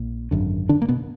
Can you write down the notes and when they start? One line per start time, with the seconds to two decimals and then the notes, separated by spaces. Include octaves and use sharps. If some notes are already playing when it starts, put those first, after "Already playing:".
Already playing: A#1 A#2
0.31 G#1 F#2 D3
0.69 D3 D4
0.82 A#3
0.88 B2 B3